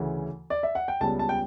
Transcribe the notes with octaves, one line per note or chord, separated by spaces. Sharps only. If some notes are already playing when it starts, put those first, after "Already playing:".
Already playing: D2 C#3 E3
D5
E5
F#5
G5
C#2 C#3 G3 B3 A5
A5
G5